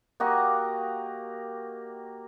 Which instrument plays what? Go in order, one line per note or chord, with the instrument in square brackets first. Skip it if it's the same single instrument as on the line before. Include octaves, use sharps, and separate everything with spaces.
[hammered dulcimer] A#3 F#4 G4 D#5